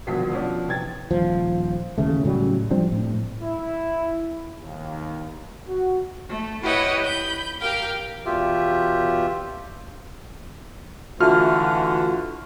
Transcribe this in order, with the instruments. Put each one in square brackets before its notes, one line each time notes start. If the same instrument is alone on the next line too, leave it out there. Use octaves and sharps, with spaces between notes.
[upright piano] D#1 A#1 B2 D3 B6 C7
B2 F3 C#4 D4 F#4
C3 E3 G5 G#6 A6
[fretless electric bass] D#1 F3
A1 D#2 C#3 A3
A2 C#3 F#3 G3
F3 G3 C4 D4
A2
[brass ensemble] E4
D#2
F#4
[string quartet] A3
E4 G4 B4 C#5 D#5 F#5
B5 G6
G4 A#4 F5 G5
[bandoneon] E2 B2 F4 G4 E5
[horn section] D3 E3 A3 [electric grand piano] F4 F#4 F6